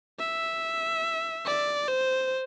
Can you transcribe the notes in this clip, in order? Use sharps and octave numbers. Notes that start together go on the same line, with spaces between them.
E5
D5
C5